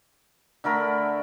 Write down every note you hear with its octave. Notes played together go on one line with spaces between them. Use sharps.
D3 A3 A#4 B5